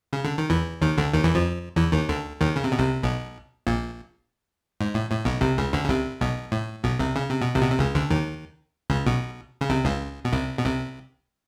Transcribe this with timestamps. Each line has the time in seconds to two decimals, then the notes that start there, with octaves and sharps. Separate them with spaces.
0.13 C#3
0.25 D3
0.38 D#3
0.50 E2 E3
0.82 D#2 D#3
0.97 D2 D3
1.14 D#2 D#3
1.24 E2 E3
1.35 F2 F3
1.76 E2 E3
1.92 D#2 D#3
2.09 D2 D3
2.41 D#2 D#3
2.56 C#3
2.64 C3
2.72 B2
2.79 C2 C3
3.03 B1 B2
3.67 A#1 A#2
4.81 G#2
4.94 A2
5.10 A2
5.25 B1 B2
5.41 C2 C3
5.58 C#2 C#3
5.73 D2 D3
5.84 C#3
5.89 C2 C3
6.21 B1 B2
6.52 A2
6.84 B1 B2
6.99 C2 C3
7.16 C#3
7.30 C3
7.41 B2
7.55 C2 C3
7.63 B2
7.71 C3
7.79 C#2 C#3
7.95 D2 D3
8.10 D#2 D#3
8.90 C#2 C#3
9.07 B1 B2
9.61 C#3
9.70 C2 C3
9.85 C#2 C#3
10.25 B2
10.32 C2 C3
10.58 B2
10.64 C2 C3